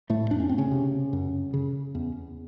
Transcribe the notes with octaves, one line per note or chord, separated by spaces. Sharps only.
A2 A3
F2 D4
C#4
C4
C#3 C#4
C3
F#2
C#3
E2